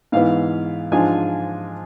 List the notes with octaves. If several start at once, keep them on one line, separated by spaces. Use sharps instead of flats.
G#2 E3 B3 F5
G#2 F3 G#3 D4 F4 G#5